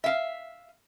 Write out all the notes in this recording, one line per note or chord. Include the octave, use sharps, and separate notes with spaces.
E5 F5